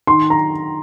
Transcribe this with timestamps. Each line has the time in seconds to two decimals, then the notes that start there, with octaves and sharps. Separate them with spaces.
0.07 D#3 C6
0.30 A#5